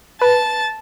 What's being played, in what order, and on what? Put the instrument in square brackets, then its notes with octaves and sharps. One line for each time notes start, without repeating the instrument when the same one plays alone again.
[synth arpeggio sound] B4 [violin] A5 A6